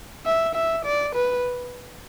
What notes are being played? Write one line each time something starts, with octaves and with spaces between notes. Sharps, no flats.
E5
E5
D5
B4